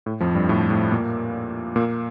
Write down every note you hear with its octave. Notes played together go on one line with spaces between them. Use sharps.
A2
F2 F3
G2 G3
A2 A3
A2 A3
A#2 A#3
A#2 A#3